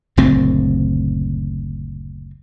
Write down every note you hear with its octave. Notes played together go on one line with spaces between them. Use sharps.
F#1 D2 A#2 C4